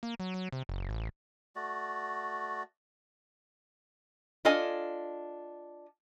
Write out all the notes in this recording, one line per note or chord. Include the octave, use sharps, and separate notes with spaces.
A#3
F#3
F#3
C3
F#1
A1
A3 F#4 D5
D4 F4 A4 D#5 G#5